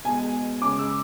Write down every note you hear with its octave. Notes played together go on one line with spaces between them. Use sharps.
B2 G#3 G#5
C#3 G#3 D6
E6